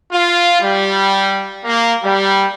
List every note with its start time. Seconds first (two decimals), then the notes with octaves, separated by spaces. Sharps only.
0.12 F4
0.61 G3
1.64 A#3
2.02 G3